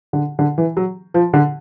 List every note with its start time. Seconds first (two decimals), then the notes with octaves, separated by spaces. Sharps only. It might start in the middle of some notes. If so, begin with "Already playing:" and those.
0.13 D3
0.39 D3
0.58 E3
0.77 F#3
1.14 F3
1.34 D3